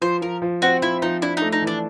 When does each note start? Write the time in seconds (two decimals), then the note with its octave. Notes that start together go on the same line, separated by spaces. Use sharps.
0.01 F3 C5
0.22 F3 A#4
0.42 F3
0.62 C4 F#4
0.82 F3 E4
1.02 F3 D#4
1.22 D4 E4
1.37 A3 D#4
1.52 D#4
1.62 E3
1.67 D4